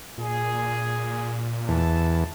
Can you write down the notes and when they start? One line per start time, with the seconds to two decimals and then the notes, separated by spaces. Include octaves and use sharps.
0.18 A#2 G#4
1.68 E2 A5